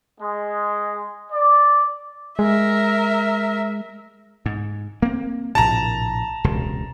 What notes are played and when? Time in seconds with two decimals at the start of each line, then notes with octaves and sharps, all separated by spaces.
0.21 G#3
1.32 D5
2.39 G#3 A#4 E5
4.46 G#2
5.02 A#3 C4
5.55 A#1 A2 C3 A5 A#5
6.44 E1 C#2 C3